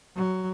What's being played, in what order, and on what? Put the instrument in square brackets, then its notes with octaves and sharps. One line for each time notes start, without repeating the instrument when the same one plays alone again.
[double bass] F#3